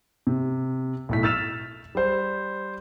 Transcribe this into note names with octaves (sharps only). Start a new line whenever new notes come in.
C3
B1 A2 B6
E6 F6 A6 B6 E7 F7
G3 C5